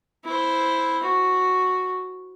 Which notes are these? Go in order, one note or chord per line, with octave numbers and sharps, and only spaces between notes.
E4 C5
F#4